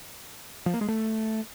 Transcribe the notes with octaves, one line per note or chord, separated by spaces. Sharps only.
F3
A#3
G#3
A3